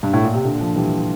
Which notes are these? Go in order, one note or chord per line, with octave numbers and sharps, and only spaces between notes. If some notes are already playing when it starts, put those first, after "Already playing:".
G2
A2
A#2
C3
A#2 D3
D3 F3
E3 G3